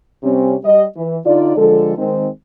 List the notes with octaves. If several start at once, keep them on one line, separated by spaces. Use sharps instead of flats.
C3 G3 C4 C#4
G3 D#5
E3
D3 D#4 F4 D5
D3 F3 G#3 A4
D#3 G#3 C4